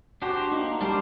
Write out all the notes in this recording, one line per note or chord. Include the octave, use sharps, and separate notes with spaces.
D4 F#4 G4 C5
A#3 D#4
G3 D4 G4 C5